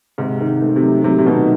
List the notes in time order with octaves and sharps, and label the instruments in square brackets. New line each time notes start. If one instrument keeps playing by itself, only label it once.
[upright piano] G#2 [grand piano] C3
[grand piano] D#3
A3
[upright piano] C3
[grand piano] F#3
[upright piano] C3 [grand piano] F#3
[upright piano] C3
[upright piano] B2 [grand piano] D#3